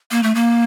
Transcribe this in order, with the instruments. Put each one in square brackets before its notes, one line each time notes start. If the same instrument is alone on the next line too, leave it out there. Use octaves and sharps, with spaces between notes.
[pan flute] A#3
A3
A#3